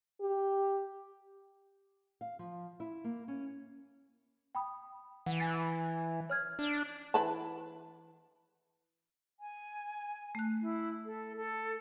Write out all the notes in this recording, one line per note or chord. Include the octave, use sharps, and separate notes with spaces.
G4
F5
F3
E4
A#3
C#4
G5 B5 D#6
E3 F#5
G#5 A6
C#5 F6 G#6
D4
E3 B4 A5
G#5
A3 F#6
E4
A4
A4